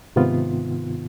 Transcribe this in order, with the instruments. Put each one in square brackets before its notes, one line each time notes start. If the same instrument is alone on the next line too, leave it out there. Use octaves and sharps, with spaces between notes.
[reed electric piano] G#2 C3 D#3 B3 F4